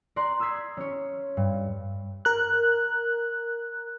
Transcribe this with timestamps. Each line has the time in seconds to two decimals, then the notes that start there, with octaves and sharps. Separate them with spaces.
0.16 A#4 D5 C6 F#6
0.40 D#6 E6 F#6 G#6 B6 C7
0.77 C#4 C#5
1.37 G2
2.25 A#4 F#6